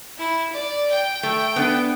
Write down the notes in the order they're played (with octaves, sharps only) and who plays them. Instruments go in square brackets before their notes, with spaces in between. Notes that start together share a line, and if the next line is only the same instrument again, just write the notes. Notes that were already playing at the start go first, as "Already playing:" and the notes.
[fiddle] E4
D5
G5
[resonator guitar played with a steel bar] A3
B3 D4 B4